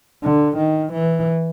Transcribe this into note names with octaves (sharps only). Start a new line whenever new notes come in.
D3
D#3
E3